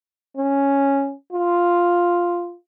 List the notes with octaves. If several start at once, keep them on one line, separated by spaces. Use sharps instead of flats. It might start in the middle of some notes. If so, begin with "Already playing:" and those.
C#4
F4